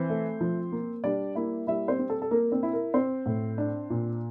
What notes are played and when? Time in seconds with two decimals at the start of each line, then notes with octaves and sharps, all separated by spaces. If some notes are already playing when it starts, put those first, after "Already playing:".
Already playing: E3 C4 C5
0.10 A3
0.41 F3
0.72 A#3
1.04 G3 D4 D5
1.35 A#3 E4 E5
1.67 G3 E4 E5
1.88 C4 C5
1.99 C4
2.10 A4
2.22 A4
2.31 A#3 A#4
2.52 C4 C5
2.63 E4
2.73 A#4
2.94 C4 C5
3.26 A2
3.58 D4
3.90 A#2